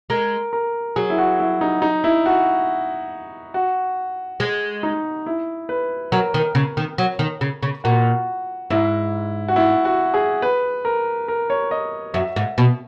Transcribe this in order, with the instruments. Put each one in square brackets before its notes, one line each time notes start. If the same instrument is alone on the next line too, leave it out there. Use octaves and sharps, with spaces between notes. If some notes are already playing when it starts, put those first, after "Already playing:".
[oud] G#3 [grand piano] A#4
[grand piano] A#4
[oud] F#3 [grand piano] G#4
[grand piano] E4
F#4
E4
D#4
D#4
E4
F#4
F#4
[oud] G#3
[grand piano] D#4
E4
B4
[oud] F#3 [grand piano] A#4
[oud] D#3
C#3
D#3
F#3
D#3
C#3
C#3
[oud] A#2 [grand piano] F#4
[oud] G#2 [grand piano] E4
[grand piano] F#4
E4
F#4
G#4
B4
A#4
A#4
C#5
D#5
[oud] F#2 [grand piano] E5
[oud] G#2
B2